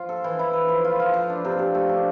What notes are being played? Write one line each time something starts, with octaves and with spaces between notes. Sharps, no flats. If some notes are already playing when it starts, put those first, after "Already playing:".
Already playing: F3 F4
A4
E3
E4
B4
F3
F4
F4
F3
D4
C3
C3
A3
D4